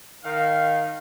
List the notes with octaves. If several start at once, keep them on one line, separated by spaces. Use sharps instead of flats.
D#3 F5